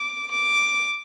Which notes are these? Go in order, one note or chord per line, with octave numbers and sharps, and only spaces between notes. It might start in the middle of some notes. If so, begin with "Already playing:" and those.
Already playing: D6
D6